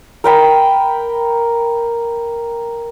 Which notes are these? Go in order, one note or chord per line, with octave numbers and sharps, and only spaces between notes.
A#4 G5 B5